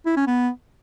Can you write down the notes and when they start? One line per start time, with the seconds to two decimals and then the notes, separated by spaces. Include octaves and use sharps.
0.06 E4
0.16 C#4
0.27 B3